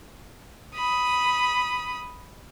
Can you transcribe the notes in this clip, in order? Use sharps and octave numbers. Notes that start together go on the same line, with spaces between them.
B5 D#6